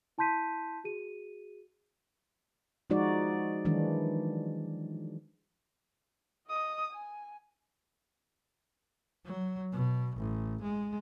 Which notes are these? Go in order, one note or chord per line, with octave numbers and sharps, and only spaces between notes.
E4 A5 C6 G6 B6 D#7
F#4 G#4 D#7
F3 G#3 D#4 F#4 D5
D#3 E3 F#3 G#3 D4
D#5 D#6
G#5
F#3
B2
A1
G#3